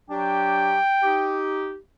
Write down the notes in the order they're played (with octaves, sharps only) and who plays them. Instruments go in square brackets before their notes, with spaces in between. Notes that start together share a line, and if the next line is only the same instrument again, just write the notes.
[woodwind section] F#3 D4 G4 [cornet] G5
[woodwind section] D#4 G4